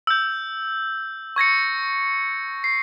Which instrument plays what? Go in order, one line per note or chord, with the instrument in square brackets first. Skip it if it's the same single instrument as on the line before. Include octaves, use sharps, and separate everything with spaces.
[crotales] E6 G6
C#6 G#6 A#6 C#7
C7